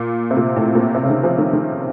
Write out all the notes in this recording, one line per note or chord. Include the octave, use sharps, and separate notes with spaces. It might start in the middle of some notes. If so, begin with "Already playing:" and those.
Already playing: A#2
C3
A#2
A2
A#2
C3
C#3
D#3
F3
D#3
D#3